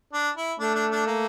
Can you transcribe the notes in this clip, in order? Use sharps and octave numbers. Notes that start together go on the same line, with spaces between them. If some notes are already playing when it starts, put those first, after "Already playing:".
D4
E4
A3 D4
D4
D4
A#3